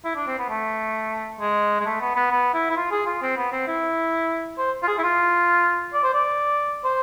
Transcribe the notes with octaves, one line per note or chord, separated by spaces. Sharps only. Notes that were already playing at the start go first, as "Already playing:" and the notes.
E4
D4
C4
B3
A3
G#3
G#3
A3
B3
B3
B3
E4
E4
F4
G#4
F4
C4
B3
C4
E4
C5
F4
G#4
E4
F4
D5
C5
D5
C5